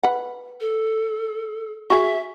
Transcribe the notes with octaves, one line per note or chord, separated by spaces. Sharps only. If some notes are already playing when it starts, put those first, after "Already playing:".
B4 F#5
A4
F#4 G#4 E5